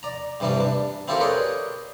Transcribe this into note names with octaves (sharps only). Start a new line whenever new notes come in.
D5 A#5
G2 C3 E3 G3 D4
D4
C4 E4 F4 G4 A4 A#4
G#4 A#4 B4 C#5 D5 G5